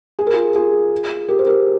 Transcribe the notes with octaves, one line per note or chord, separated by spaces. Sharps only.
G#4
A#4
F4 G#4
F4 G#4
G4 A#4
C5
G4 A#4